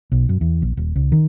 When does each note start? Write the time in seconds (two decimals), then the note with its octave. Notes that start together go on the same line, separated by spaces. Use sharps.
0.12 B1
0.29 F#2
0.41 E2
0.62 A#1
0.77 D#1
0.96 C#2
1.12 D#3